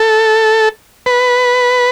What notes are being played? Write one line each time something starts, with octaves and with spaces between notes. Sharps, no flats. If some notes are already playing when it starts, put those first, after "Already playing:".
Already playing: A4
B4